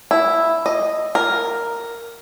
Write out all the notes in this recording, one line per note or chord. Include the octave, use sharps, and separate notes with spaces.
E4
D#5
A#4